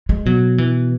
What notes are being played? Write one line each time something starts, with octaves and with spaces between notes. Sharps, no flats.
G#3
B2 F#3
E3